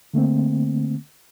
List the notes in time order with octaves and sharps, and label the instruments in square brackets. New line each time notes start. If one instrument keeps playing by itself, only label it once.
[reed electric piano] D3 A3 A#3 C4